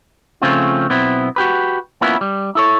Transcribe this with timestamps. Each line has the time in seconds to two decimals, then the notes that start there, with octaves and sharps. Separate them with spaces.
0.42 C#3 F3 A3 C4 C#4 F4
0.90 B1 B3 C4 E4
1.36 F#4 G4 B4
2.01 A#3 B3 C#4 E4 F4 B4
2.21 G3
2.55 E4 A4 C#5